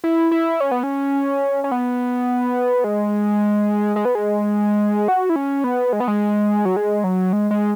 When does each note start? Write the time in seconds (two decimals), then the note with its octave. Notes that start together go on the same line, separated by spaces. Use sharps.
0.04 E4
0.32 E4
0.60 C#4
0.71 B3
0.83 C#4
1.64 C#4
1.71 B3
2.84 G#3
3.96 G#3
4.05 B3
4.15 G#3
5.08 F#4
5.29 E4
5.36 C#4
5.64 B3
5.93 G#3
6.00 B3
6.08 G#3
6.65 F#3
6.76 G#3
7.04 F#3
7.33 G#3
7.51 G#3